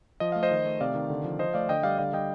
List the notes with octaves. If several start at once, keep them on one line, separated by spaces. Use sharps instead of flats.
F3 D#5
A3 F5
C5 D#5
D#3
A3
C3 D5 F5
D#3
D3
F3
F3 C5 D#5
A3 D5 F5
D3 D#5 G5
G3 D5 F5
D3 D5 F5
G3 D#5 G5